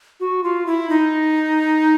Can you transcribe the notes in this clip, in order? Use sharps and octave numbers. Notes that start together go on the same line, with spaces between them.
F#4
F4
E4
D#4